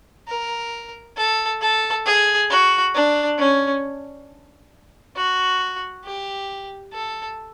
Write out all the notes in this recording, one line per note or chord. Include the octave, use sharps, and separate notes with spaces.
A#4
A4
A4
G#4
F#4
D4
C#4
F#4
G4
A4